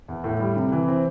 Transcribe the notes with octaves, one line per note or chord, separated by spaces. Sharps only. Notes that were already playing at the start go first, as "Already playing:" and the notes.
E2
A2
G3
C3
E3
C4